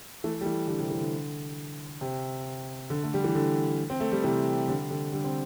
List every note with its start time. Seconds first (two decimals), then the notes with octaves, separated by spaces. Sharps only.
0.24 E3 A3
0.41 G3
0.45 E3 A3
0.68 D3 G3
0.80 C3 E3
0.90 C3 E3
1.01 D3
2.01 C3
2.90 D3
3.03 A3
3.14 G3
3.24 E3
3.35 D3
3.90 C4
4.00 A3
4.12 G3
4.24 C3 E3
4.68 D3 G3
4.90 D3 G3
5.12 D3 G3
5.24 C4